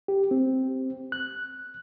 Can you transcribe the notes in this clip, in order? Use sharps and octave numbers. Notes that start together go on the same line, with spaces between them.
G4
C4
F#6